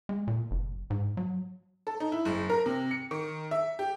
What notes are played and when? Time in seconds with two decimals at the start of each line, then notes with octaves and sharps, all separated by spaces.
0.09 G#3
0.27 A#2
0.51 F#1
0.90 G#2
1.17 F#3
1.87 A4
2.00 D#4
2.12 E4
2.25 F#1
2.50 A#4
2.66 C3
2.91 C#7
3.11 D#3
3.51 E5
3.79 G4